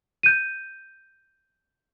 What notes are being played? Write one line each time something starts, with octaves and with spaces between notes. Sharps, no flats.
G6 D#7